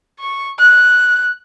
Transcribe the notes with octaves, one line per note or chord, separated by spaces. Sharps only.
C#6
F#6